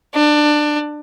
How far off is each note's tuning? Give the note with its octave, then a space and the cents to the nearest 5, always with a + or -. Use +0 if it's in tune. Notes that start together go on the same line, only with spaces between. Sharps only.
D4 +20